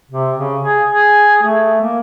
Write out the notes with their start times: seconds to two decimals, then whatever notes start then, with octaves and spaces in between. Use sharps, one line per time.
0.11 C3
0.38 C#3
0.63 G#4
0.87 G#4
1.43 A3
1.82 A#3